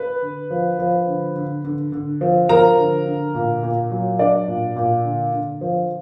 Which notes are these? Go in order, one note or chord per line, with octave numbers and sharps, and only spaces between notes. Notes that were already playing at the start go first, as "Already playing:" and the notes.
Already playing: B4 B5
D3
F3
F3
D3
D3
D3
D3
F3
F3 A#4 A#5
D3
D3
A#2
A#2
F#3
F#3 D4 D5
A#2
A#2
D3
D3
F3